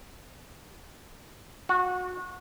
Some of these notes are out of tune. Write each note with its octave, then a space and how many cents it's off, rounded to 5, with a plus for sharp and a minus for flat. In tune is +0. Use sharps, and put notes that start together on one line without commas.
F#4 -25